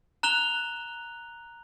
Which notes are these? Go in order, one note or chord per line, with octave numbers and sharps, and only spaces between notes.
A#5 F#6 F7 G7